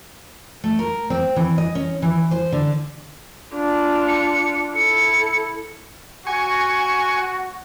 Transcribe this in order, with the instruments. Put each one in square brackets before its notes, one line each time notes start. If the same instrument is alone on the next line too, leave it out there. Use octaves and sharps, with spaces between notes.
[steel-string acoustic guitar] A3
A#4
C4
E3
D#5
C#4
E3
C5
D3
[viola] D4 F4
[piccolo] C#7
[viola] E4 A4 [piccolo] C#7
[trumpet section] F#4 [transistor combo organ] G#5 C#6